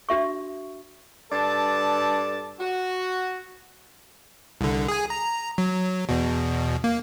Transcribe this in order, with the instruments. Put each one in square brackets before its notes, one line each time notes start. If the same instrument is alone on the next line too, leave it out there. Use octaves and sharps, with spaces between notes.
[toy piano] D4 F#4 E5 C#6
[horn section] G2 A4 D5 A5
F#4
[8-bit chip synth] C2 D3
G#4 G#5
A#5
F#3
E2 B2
A#3